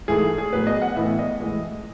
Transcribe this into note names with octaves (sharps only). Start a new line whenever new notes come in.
G#2 E3 A3 G#4
G#4
A2 F#3 B3 B4
D#5
F#5
A2 E3 B3 E5
D#5
A2 E3 G#3